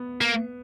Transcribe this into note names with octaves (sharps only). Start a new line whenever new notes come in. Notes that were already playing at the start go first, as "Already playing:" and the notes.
Already playing: B3
A#3